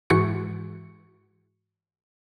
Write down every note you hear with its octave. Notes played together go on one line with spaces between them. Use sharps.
G#2 E3 G#3 F#4 C#6 C#7